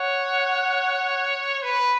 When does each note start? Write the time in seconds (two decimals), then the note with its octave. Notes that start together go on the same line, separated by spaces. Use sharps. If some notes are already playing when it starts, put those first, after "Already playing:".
Already playing: C#5 F#5
1.63 B4